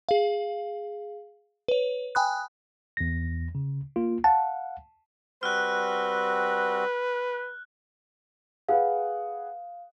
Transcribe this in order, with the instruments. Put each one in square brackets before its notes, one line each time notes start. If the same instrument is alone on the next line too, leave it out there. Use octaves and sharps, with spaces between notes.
[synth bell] G#4 F5
B4 C#5
G5 G#5 B5 D#6 F#6
[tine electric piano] E2 A#6
C#3
A#3 F4
[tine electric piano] F5 F#5 [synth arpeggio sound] A5
[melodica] G3 C4 F#4 [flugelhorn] B4 [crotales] F6 F#6
[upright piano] G#4 B4 F#5 [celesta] F5